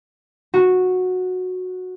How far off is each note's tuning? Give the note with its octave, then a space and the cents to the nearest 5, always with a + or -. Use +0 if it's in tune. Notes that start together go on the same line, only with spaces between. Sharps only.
F#4 -10